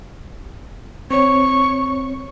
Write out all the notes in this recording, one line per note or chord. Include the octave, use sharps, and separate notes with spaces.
C4 C#5 C#6